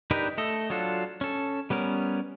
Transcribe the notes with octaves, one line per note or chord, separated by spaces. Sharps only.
D4 D#4 G4 A#4 B4
A3 A4 D#5
F#3 D4 F4 A4
C#4 A4
G3 B3 C#4 A#4